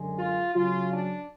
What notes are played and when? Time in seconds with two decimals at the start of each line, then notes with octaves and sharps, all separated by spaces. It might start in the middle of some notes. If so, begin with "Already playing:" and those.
Already playing: F#2 D3 G#3
0.18 F4
0.54 C#3 F#3 C#4 F4
0.90 D4